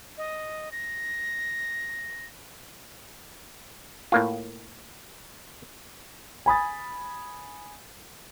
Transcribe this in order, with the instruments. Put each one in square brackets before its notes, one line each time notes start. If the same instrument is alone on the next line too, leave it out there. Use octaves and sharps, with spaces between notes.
[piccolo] D#5
A#6
[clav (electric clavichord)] A2 A#3 F4
[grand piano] G#5 B5 D#6 A6